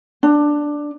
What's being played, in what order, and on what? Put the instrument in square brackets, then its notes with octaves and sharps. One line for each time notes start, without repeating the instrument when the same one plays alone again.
[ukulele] D4